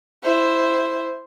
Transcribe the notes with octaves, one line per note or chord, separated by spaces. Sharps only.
E4 C5